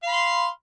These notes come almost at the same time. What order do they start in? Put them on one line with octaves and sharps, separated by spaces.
F5 B5 C6